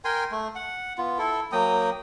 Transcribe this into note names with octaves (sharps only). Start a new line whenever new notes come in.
A#4 G5 G#5 C6
A3
F#5
B3 F4
E4 A4
F#3 A#3 G5 D#6